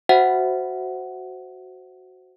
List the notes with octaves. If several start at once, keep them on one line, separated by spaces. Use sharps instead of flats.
F#4 C5 E5 F#5